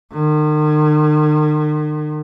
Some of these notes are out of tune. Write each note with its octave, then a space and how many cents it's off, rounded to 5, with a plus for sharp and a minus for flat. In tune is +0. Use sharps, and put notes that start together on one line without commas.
D#3 -45